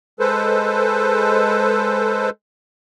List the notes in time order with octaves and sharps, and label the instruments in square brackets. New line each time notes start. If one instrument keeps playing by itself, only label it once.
[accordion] G#3 A4 B4 C5